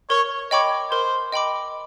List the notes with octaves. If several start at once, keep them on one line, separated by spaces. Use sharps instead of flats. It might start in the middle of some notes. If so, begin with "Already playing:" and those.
A#4 C#5
C#5 D#5 G5 B5 D6
A#4 C5
D#5 G5 B5 D6